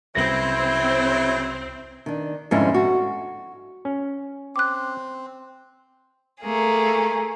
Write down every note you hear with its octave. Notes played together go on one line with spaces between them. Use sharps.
C2 C#3 E3 F#3 C4 E4 A#6
D#3 D4
F2 G#2 D3 G3 C#4 E4
F#4
C#4
C4 D6 F#6
A3 A#3 G#4